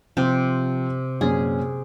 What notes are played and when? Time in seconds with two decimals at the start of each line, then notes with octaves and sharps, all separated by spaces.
0.17 C3 F3 C4 F4 G4
1.21 F#2 A#2 C#4 G#4